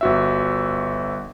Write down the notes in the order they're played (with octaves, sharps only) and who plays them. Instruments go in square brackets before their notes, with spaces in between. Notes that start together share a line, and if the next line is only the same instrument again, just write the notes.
[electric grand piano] G1 F#4 E5